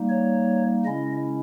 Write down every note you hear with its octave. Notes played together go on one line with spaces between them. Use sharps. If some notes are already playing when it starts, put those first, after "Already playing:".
Already playing: G3 A#3 D#4
C#5
C#3 G#3 C#4 E4 D#5